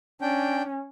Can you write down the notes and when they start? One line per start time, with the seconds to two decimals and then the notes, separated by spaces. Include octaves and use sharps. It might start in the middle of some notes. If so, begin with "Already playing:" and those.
0.22 C#4 D4 G5